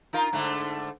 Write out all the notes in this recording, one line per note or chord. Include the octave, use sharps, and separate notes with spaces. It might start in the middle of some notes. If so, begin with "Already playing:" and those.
D#4 F4 A#4
G#2 D3 A3